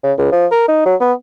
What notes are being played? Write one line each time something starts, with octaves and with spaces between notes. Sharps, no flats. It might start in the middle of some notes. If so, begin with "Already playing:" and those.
C#3
C#2
F3
A#4
D#4
F#3
B3